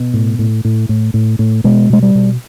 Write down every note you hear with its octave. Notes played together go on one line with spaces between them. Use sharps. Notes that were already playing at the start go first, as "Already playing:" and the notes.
Already playing: B2
A2
A2
A2
A2
A2
A2
B2 G#3
B2 G#3
G3
B2